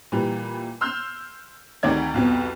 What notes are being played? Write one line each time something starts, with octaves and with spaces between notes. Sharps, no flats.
A#2 E3 G3
C6 E6 F6 G6
D2 C3 D#3 D5 G#6
C2 F2 B2